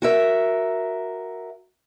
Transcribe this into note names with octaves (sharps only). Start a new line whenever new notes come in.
F#4 A#4 E5